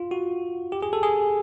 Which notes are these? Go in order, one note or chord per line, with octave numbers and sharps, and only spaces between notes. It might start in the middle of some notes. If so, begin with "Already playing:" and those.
Already playing: F4
F#4
G4
G#4
A4
G#4